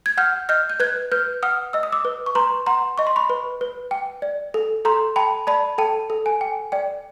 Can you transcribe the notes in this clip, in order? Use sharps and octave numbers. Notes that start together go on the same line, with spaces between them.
G#6
F#5 F6 G6
D#5 F6 G6
G6
B4 F#6 G#6
B4 F6 G6
F#5 D#6 F6
D#5 E6
D#6
D6 E6
B4
C#6
B4 A#5 C6
F#5 A#5 C6
D#5 C#6
C6
B5 C#6
B4
B4
G5
D5
A4
A4 A#5 C6
G5 A5 B5
D5 A5 B5
A4 G5 A5
A4
G#5
G5
D5 G5